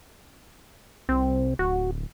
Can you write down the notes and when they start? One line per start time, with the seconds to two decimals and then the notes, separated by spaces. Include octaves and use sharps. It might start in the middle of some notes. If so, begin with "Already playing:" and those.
1.09 C2 C4
1.59 D1 F#4